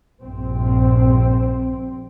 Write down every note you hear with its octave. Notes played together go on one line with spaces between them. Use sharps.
A#1 G2 C4